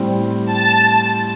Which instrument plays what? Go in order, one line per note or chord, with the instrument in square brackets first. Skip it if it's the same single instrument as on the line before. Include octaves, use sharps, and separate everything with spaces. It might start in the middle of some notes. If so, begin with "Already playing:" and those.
Already playing: [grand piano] A2 G3 C4 G4
[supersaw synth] A5